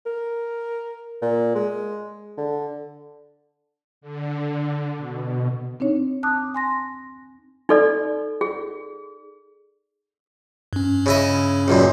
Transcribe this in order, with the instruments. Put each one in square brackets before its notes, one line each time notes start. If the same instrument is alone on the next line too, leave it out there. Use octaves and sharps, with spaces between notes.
[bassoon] A#4
A#2
G#3
D3
[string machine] D3
B2
[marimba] C4 D4 D#4 C#5
A5 D6 D#6 F#6
G#5 C6 A#6
[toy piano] D#4 A4 D5
G#4
[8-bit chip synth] G2 C#4
[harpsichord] C#3 E4 D#5
C#2 F#2 A#2